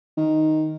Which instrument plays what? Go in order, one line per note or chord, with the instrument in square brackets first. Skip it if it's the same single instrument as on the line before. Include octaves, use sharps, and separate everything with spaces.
[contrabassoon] D#3